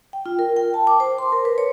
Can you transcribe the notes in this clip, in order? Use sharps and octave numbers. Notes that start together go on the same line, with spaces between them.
G5
F4
A#4
G5
A5
D6
C5
C6
A#4
B4
C#5